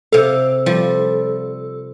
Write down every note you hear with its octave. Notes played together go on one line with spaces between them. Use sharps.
C3 A4 F5
F3 G3